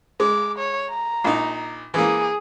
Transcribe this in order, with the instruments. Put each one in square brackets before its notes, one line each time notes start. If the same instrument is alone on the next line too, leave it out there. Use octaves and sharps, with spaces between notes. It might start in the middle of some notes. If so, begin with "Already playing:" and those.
[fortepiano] G#3 [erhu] D6
[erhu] C#5
A#5
[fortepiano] A#1 D#4
[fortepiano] E3 A#3 [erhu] G#4